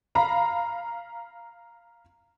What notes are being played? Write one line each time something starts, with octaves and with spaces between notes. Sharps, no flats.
F5 A#5 B5